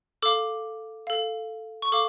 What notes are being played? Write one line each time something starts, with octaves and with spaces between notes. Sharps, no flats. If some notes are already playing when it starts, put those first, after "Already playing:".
A4 F5 D6
A4 F5
C#6
A4 F5 D6